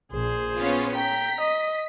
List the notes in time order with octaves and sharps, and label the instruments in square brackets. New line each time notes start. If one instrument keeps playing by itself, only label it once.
[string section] A#1 [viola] G#4 C5
[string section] B3 C#4 F4
[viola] G5 A#5 [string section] B6
[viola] D#5